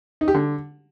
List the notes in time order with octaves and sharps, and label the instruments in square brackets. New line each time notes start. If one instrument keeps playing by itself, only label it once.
[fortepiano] D#4
G4
D3